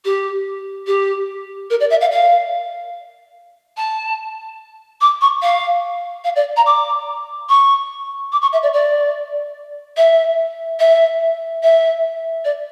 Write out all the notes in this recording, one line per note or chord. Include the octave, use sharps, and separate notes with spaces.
G4
G4
A#4
D5
E5
F5
F5
A5
D6
C#6
F5
F5
D5
A#5
D6
C#6
D6
C#6
E5
D5
D5
E5
E5
E5
D5